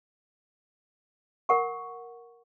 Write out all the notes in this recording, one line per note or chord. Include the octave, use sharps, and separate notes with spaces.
A#4 F#5 C#6